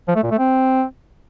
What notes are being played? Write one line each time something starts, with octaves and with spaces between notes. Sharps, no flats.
F3
A3
A#2
A3
C4